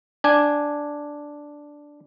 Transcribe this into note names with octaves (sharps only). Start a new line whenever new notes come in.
D4 G#5